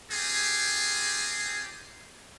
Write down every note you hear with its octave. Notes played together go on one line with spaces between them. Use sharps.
C4 F4 G4 G#4